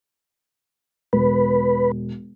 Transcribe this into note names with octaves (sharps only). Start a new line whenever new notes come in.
E1 B4